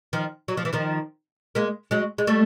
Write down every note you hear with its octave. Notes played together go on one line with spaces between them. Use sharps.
D#3 F3
F#3
F3
E3
D#3 F3
G#3 A#3
F#3 G#3
G#3
G3 A3